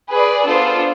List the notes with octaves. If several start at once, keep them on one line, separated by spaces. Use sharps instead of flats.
G#4 B4 D5
B3 D4 F4 A4 C5